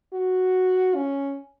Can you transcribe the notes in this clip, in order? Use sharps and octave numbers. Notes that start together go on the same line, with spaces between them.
F#4
C#4